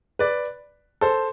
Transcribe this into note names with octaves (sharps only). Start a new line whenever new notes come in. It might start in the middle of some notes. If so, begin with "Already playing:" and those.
B4 D5
A4 C5